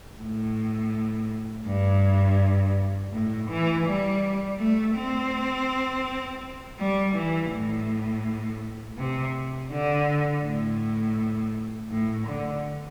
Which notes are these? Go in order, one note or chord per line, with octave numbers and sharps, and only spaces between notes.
A2
G2
A2
E3
G3
A3
C4
G3
E3
A2
C3
D3
A2
A2
D3